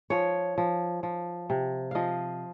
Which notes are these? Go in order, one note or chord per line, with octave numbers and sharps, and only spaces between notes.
F3 C#5
F3
F3
C3
F3 D#5 F5